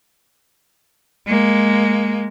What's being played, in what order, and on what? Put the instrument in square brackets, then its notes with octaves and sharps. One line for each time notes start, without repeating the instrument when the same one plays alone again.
[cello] G#3 A#3